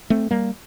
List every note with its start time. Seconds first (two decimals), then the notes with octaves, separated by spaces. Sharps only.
0.10 A3 C4
0.31 G3 A#3